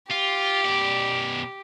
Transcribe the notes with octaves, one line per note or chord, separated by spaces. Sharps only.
F4 G4
B2 D5